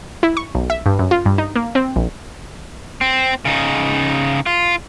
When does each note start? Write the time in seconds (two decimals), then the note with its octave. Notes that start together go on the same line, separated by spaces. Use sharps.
0.23 E4
0.37 C#6
0.55 B1
0.70 E5
0.86 G2
0.99 F#2
1.11 F4
1.26 G2
1.38 D#4
1.56 A#3
1.75 C4
1.96 A#1
3.01 C4
3.45 C#3 D#4
4.46 F4